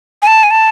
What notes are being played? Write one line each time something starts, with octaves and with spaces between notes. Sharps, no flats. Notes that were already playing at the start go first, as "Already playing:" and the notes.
G#5
A5
G#5
A5